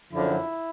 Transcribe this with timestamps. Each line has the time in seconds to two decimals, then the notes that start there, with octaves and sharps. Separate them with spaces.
0.11 F#2 D3 F3 E4